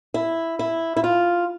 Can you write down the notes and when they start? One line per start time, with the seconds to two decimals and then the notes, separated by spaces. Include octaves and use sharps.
0.14 E4
0.59 E4
0.97 E4
1.04 F4